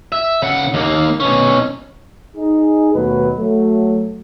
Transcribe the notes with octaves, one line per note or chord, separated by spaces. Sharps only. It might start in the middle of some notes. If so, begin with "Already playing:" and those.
E5
C#3 F#5
D#2 A#3
B2 C#4
D#4 G#4
D#2 B2 D#3 F#3 A3 B4
F#3 A3